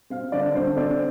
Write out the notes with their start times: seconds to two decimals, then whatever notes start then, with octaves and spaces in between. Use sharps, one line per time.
0.10 C4 F5
0.32 D3 D5
0.55 D3 C5
0.77 C4 D5